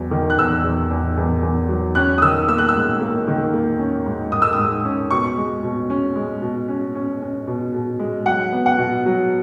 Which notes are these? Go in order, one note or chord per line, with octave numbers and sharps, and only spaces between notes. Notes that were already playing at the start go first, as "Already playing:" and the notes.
Already playing: E2 F#3
D#3
F#6
E2 E6
E2
E2
E2
E2
F#3
C#4 F#6
D#6
D#3 E6
A#3 E6
F#6
E6
G#2
A#3
D#3
A#3
C#4
G#2
G#2 D#6
E6
D#6
G#2
C#4
B2 C#6
G#3
B2
C#4
G#3
B2
C#4
C#4
C#4
B2
B2
G#3
F#3 F#5
B3
F#5
B2
F#3